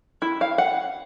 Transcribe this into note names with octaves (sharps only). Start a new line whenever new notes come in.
E4
F5
F#5